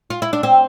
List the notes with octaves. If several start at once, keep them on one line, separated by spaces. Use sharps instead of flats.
F4
E4
D4
C4